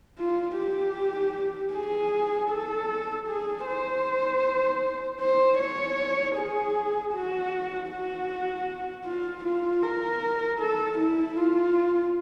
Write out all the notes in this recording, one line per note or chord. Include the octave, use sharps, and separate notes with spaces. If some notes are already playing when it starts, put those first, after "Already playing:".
F4
G4
G#4
A4
G#4
C5
C5
C#5
G#4
F#4
F#4
F4
F4
A#4
A4
E4
F4